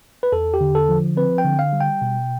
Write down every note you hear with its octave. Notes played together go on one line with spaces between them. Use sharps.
B4
E2 A4
G4
D3
A4
F3
C4 B4
G5
D3
F5
G3
G5
B2